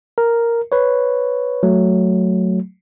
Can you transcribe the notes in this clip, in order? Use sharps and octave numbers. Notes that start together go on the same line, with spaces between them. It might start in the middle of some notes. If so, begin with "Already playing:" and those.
A#4
B4 C#5
F#3 A3